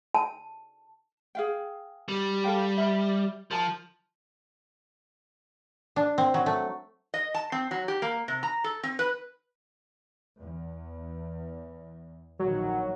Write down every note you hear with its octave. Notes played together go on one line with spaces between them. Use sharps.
A5
G#4 F5 G5
G3
A4 F5 G5
E5 B5
F3 A#4 A5
D4
C4
F#3
A3
D#5
A5
C4
F#3
G4
A#3
C3
A#5
A4
C4
B4
E2
A#1 D#3 F#3